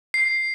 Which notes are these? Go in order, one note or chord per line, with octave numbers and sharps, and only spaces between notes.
C7